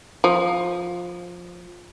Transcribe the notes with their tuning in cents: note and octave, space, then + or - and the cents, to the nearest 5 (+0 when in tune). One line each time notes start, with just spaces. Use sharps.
F3 +15